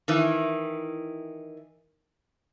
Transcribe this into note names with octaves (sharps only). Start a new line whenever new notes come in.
D#3 E3